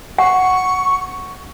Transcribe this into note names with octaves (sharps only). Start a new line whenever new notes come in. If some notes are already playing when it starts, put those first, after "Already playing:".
F#5 C#6